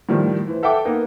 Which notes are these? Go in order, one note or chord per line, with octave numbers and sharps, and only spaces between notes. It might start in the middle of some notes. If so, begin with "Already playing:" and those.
A2 D#3 F3 G3
E3 C5
A4 E5 F#5 G5 D6
A#3 B3 D#4